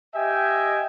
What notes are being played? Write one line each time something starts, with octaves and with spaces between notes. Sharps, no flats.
G4 D#5 E5 G5 G#5